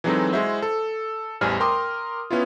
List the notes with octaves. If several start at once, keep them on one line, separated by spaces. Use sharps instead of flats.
E3 F#3 G#3 C4 D#4 A4
G#3 E4 F#4 C5 E5
A4
A1 E2 G3 C5 G#5 F6
A#4 G5 A#5 C6 D6 D#6
B3 C#4 E4 F4